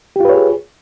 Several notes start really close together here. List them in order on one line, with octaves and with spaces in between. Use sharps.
G4 F4 B4 C#5 G#4